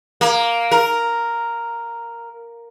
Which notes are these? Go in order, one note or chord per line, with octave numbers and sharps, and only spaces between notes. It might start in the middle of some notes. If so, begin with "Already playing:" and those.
A#3
A#4